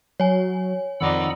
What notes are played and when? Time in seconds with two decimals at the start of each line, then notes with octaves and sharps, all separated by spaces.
0.20 F#3 C#5 G#5
1.01 F2 D#3 D#4 D5 F#5 B5 E6